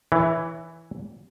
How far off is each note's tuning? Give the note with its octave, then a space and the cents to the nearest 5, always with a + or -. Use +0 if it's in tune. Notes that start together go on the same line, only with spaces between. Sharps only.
E3 +0 C#5 +25